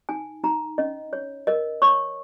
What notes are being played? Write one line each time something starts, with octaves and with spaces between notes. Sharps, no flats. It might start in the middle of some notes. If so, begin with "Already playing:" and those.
D#4 G#5
D#4 A#5
C#4 D#5
C#5
A#4 D#5
C#5 C#6